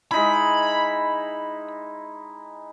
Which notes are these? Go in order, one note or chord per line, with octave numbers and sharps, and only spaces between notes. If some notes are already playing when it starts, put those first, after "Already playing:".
G#3 D#4 E4 B5